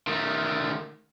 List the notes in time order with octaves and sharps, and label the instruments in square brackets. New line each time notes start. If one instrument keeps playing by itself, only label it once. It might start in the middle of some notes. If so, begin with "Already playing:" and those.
[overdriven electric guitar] D#3 A3